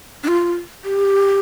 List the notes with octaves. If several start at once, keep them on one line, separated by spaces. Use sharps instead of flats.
D4
F4
G4